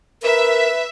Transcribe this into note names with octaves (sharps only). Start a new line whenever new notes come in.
A#4 B4 E5